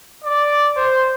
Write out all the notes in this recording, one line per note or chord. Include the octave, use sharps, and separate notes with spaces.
D5
C5